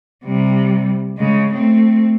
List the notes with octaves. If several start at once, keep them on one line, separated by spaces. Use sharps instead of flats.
C3 G3
C#3 G#3
A3 C4